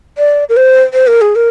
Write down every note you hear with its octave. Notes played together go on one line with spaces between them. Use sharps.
D5
A#4
C5
C5
A#4
G#4
A#4